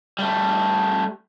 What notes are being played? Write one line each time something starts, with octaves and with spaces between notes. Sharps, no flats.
G3 A3